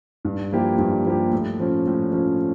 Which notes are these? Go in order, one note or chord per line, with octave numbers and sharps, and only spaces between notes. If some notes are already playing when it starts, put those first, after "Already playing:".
G2
F3 A#3 E4 G4
G2
F3 A#3 E4 G4
A2
F3 C#4
A2
F3 C#4